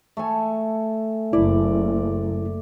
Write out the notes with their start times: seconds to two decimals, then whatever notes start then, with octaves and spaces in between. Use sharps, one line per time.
0.17 A3 A4 G#5
1.33 F#1 E4 D5